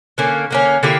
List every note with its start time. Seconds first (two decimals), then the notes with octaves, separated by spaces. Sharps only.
0.18 D3 A#3 C#4
0.51 D3 A#3 C#4
0.83 D3 A#3 E4 G4